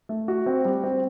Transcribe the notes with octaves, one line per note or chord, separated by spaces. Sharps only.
A3
F#4
C4
G3
C4